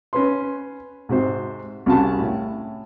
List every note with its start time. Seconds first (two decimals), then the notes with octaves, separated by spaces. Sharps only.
0.13 C#4 B4 C6
1.09 G#2 C3 F#4 C5
1.86 C2 C#3 F#4 G#5 A5 B5
2.19 A2